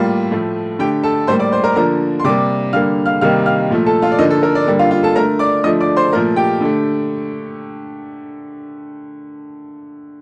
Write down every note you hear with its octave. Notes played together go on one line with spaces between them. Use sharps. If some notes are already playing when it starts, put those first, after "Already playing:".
Already playing: A2 G3 A#3 F4 F5
A2 F3 A3
D3 A3 G4 G5
A4 A5
A2 G3 A#3 C5 C6
D5 D6
C5 C6
A#4 A#5
D3 F3 A#3 A#4 A#5
C6
C3 G3 A#3 D5 D6
D3 G3 A#3 F5 F6
F5 F6
C3 D#3 G3 A#3 F5 F6
F5 F6
A#2 F3 A3
A4 A5
F4 F5
D5
D3 F3 A#3 D#4 D#5
A4
A#4
D4 D5
D3 G3 A#3
F4 F5
F4 F5
A4 A5
D3 A3 A#4 A#5
D5 D6
D3 F3 A3 D#5 D#6
D5 D6
C5 C6
A#2 F3 A3 A#4 A#5
G4 G5
D3 A3